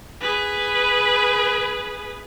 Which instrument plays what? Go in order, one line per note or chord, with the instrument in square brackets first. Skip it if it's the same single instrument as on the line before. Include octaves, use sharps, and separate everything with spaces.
[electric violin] G#4 B4